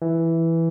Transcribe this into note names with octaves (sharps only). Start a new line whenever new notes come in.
E3